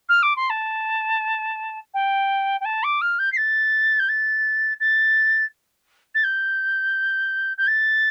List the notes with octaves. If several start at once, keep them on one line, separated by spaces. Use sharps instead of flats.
F6
D6
C6
A5
G5
G5
A5
D6
F6
G6
C7
A6
G6
A6
A6
A6
G6
G6
A6